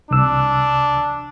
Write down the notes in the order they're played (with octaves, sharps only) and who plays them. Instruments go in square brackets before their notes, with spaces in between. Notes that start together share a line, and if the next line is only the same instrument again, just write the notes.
[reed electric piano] C2 E6 [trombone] D4